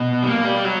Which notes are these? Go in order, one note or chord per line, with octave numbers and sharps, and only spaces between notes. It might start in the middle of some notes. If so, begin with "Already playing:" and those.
Already playing: B2
G3
A#3
G3
F#3